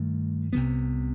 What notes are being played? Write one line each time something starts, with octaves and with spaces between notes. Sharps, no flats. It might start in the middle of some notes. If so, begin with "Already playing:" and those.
Already playing: G2 D#3 A3
C2 C3 F#3 B3